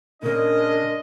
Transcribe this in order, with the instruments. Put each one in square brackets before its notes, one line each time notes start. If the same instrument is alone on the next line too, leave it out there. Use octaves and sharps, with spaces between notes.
[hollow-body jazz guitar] A#2 C#3 [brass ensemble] G#3 D4 D#5 [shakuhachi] A#4